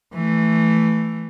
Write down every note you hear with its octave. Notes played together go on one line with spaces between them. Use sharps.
E3 A3